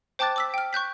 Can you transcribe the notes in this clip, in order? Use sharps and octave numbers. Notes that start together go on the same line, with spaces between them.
C5 G5 A5 D6 F#6 A6
D6 E6 B6
G5 F6
C#6 F#6 G6 B6